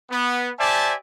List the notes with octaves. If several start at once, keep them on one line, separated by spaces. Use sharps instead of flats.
B3
G4 C5 D5 E5 G#5 A5